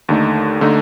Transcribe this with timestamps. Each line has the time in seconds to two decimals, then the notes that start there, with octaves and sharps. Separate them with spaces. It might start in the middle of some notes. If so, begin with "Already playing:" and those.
0.09 D#2 D3 A3 D#4
0.61 D3 A3 D#4